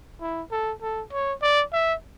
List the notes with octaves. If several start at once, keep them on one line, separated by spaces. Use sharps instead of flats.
E4
A4
A4
C#5
D5
E5